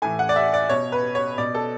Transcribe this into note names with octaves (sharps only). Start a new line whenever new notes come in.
A2 E3 G#5
F#5
D5
E5
D5
B2 C#5
B4
C#5
B2 D5
A4